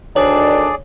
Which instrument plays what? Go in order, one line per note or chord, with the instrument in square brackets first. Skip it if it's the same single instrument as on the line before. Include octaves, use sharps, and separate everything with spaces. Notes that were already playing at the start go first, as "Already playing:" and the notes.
[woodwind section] D2 D#3 [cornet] D4 [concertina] G#4 D5 [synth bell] C#5